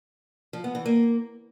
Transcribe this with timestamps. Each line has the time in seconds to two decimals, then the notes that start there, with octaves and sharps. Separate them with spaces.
0.53 F3
0.64 B3
0.75 E3
0.86 A#3